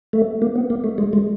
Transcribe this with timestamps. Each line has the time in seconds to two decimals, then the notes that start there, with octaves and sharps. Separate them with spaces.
0.13 A3
0.42 A#3
0.56 B3
0.70 A#3
0.84 A3
0.98 G#3
1.13 G#3